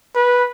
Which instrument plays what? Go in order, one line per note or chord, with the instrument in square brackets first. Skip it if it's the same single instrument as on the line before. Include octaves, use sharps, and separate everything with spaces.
[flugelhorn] B4